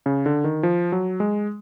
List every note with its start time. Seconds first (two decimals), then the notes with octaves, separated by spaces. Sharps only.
0.06 C#3
0.26 D3
0.44 D#3
0.63 F3
0.92 F#3
1.20 G#3